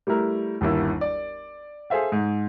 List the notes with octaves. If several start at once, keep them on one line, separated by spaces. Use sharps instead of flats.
G3 A3 E4 A#4
G1 D#2 E4
D5
G#4 A4 C5 E5 F5
G#2